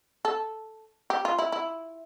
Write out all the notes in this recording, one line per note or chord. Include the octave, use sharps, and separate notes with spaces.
A4
G4
F4
E4
E4